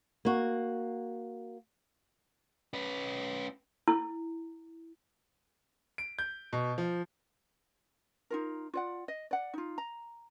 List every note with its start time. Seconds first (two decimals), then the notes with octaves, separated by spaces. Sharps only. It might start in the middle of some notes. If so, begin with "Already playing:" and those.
0.25 A#3 F#4
2.73 C#4 B4
3.88 E4
5.98 D7
6.19 G6
6.53 B2
6.78 F3
8.30 D#4 F4 A#4
8.74 F4 D5 F#5
9.08 D#5
9.31 D5 F#5
9.54 D#4 F4
9.78 A#5